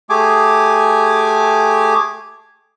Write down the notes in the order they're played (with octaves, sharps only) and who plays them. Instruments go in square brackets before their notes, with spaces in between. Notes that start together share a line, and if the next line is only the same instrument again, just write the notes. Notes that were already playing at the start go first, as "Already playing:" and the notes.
[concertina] A3 G4 G#4 G#5 D6